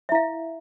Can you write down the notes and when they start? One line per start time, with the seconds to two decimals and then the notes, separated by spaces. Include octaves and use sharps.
0.09 E5
0.12 E4
0.15 F5